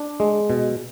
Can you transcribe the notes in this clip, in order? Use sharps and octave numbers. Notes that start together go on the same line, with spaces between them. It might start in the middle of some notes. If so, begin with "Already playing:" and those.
Already playing: D4
G#3
B2